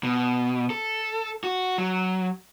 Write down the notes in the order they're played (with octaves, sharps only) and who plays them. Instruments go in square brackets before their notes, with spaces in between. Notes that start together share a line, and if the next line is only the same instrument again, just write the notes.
[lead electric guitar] B2
A4
F#4
F#3